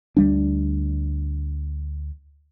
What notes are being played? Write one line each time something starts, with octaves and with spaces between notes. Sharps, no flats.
D2 G3 D4